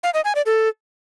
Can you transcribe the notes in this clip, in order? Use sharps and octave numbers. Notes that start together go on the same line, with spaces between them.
F5
D#5
G#5
D5
A4